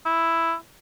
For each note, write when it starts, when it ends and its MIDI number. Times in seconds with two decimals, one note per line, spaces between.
0.06 0.54 64